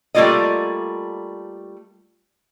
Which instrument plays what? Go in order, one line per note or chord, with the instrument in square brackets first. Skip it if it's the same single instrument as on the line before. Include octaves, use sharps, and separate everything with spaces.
[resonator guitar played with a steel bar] G3 A3 A#3 F4 D5 D#5